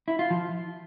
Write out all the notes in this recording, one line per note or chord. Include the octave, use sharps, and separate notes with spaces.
E4
F4
F3